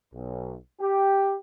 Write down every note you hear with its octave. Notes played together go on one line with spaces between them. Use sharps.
B1
G4